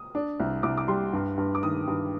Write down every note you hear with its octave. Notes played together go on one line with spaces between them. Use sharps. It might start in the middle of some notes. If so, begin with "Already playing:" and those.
Already playing: D#6
D4
C2
C2 D6
D6
G3 C6
G2
G2
D6
D#3 D#6
G2